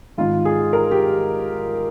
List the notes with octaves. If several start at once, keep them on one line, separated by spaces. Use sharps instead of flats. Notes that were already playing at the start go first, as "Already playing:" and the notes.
G#2 D#3 G#3 F4
G#4
A#4
G4